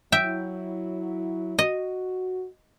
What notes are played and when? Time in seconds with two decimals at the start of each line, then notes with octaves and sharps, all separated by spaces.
0.12 F#3 E4 E5 G5
1.59 F#4 D#5